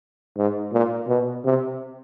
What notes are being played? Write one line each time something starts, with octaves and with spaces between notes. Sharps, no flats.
G#2
A#2
B2
C3